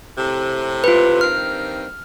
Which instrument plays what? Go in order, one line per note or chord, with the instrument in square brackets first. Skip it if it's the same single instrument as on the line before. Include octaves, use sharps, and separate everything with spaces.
[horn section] A2 C3
[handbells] F4 B4
[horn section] G2 D#3 C4 [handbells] F6